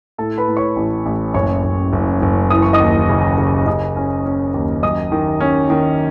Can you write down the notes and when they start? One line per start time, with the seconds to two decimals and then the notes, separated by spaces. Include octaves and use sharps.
0.18 A2 A4 A5
0.38 B4 B5
0.48 A2
0.57 C#5 C#6
0.76 A1
1.06 A1
1.34 F#1 C#5 C#6
1.64 F#1
1.93 F#1
2.22 F#1
2.50 E3 D#6
2.62 C#6
2.73 D#5 D#6
2.80 D#2
3.09 C#3
3.38 C#3
3.66 C#3 D#5 D#6
3.97 C#4
4.25 C#4
4.54 D#2
4.83 F#2 D#5 D#6
5.12 D#3
5.40 C#4
5.70 D#3